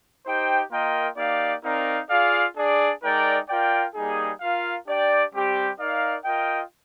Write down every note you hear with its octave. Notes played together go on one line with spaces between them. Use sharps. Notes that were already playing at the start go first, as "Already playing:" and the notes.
D#4 G4 C5 G5
A#3 F4 A#4 D#5 G5
A#3 D#4 G4 D5 F5
C4 D#4 A#4 D5 F5
F4 G#4 D5 F5
D4 G#4 D5
G#3 D#4 A#4 D5 G5
F4 A#4 D5 G5
G3 A#3 D#4 G#4
F4 A#4 F5
D4 G4 D5 G5
G3 C4 G4
D#4 A#4 D5 F5
F4 A#4 D#5 G5